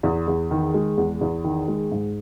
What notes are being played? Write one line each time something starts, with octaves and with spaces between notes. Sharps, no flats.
E2
E2
D#3
G#3
E2
E2
D#3
G#3
G#2